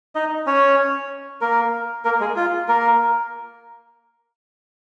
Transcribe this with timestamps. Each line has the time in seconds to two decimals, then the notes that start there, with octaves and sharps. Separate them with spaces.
0.15 D#4 D#5
0.46 C#4 C#5
1.41 A#3 A#4
2.05 A#3 A#4
2.20 G#3 G#4
2.36 F4
2.68 A#3 A#4